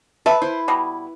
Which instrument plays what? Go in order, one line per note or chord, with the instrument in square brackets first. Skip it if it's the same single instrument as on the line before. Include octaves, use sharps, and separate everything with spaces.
[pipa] A4 E5 [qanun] B4
[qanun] E4 [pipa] C5
[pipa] B2 G3